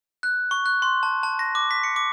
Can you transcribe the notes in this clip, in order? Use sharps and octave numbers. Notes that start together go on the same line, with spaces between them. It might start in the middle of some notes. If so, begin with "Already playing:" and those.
F#6
C#6
F#6
C6
A5
A5
A#6
D6
B6
C#7
D6